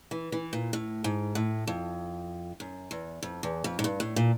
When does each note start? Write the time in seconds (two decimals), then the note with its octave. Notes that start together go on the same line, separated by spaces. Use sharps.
0.11 E3
0.32 E3
0.53 A#2
0.73 A2
1.04 G#2
1.35 A2
1.67 F2
2.60 F#2
2.91 E2
3.23 F2
3.43 E2
3.64 F2
3.79 G#2
3.84 G2
4.00 A2
4.16 A#2